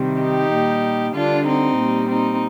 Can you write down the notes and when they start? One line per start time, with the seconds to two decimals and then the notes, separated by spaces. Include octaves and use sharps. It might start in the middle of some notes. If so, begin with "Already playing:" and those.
Already playing: C3 D#3 G3
0.20 D#4 G4
0.52 A#2 G3
1.14 D3 G3 D4 F4
1.46 C4 D#4
1.78 A#2 G3
2.08 C4 D#4